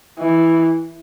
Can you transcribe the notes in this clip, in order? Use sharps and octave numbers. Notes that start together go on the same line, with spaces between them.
E3